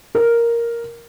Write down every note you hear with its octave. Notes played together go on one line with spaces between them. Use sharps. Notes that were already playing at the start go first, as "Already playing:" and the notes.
A#4